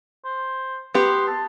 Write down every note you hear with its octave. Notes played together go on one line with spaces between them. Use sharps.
C5
B3 G4 C6
A5